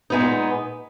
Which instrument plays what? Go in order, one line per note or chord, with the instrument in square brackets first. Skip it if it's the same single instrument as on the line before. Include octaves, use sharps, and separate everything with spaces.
[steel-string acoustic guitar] A#2 G#3 B3 D#4